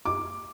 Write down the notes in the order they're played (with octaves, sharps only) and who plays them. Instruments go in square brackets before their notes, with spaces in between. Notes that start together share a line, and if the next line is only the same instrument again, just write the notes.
[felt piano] D6